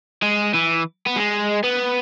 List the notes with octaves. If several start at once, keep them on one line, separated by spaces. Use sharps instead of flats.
G#3
E3
B3
G#3
B3